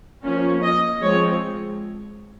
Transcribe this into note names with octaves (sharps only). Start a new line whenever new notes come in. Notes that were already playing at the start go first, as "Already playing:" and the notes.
F3 A#3 C#4
D#5
F3 G#3 C4 C#5